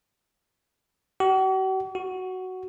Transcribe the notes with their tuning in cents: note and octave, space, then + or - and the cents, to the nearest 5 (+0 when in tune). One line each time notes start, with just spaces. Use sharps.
F#4 +45
F#4 +5